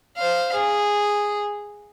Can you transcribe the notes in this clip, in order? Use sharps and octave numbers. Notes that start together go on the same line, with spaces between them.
C5 F5
G#4